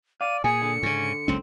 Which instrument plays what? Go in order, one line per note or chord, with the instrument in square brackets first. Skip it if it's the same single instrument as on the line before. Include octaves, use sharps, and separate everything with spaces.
[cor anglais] D5 [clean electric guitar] F5 [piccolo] D#7
[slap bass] A#2 [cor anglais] G#4 [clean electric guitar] G#5 [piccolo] C#7
[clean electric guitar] D3
[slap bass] G#2 C#3 [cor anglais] C#4
[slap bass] F#1 C#2 C#4 [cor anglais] C4